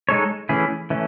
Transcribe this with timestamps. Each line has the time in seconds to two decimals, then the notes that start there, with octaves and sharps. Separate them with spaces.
0.09 G#3 D#4 A4 C#5
0.49 E3 A3 C#4 E4 G#4
0.90 E3 A3 C#4